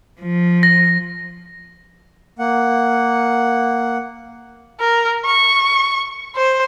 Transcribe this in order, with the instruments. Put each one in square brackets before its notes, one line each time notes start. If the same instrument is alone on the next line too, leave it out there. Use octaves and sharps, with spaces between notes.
[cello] F3
[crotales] A#6
[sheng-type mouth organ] A#3 F#5
[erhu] A#4
C#6
C5